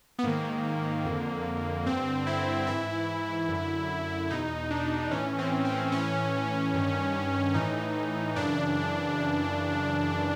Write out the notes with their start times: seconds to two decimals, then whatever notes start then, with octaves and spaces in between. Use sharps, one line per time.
0.19 B3
0.24 G#2 D#3 A#3
1.05 F2 D3
1.86 G2 D3 C4
2.27 E4
2.67 G#2 E3 E4
3.49 F#2 D3
4.30 E2 B2 D#4
4.70 D4
5.11 A2 E3 C#4
5.39 C4
5.65 C4
5.92 A2 E3 C#4
6.74 G2 D#3
7.54 A2 E3 D#4
8.36 F#2 C#3 E3 D4